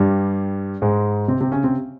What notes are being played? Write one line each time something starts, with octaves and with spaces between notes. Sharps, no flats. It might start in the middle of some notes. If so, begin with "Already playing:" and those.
Already playing: G2 G3
G#2 G#3
C3 C4
C3 C4
C#3 C#4
C3 C4